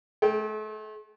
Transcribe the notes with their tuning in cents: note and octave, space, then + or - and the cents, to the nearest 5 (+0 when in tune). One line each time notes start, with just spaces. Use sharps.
A3 -40 G5 +0